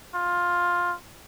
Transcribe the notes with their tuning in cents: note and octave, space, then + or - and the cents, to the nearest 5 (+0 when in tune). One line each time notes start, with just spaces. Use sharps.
F4 +10